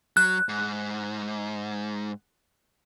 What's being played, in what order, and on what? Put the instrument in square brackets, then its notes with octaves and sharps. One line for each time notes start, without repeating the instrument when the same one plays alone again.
[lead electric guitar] F#3 [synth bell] F#6
[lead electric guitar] G#2